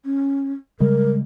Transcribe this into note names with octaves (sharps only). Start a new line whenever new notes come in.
C#4
C#3 G3 G#3 A#4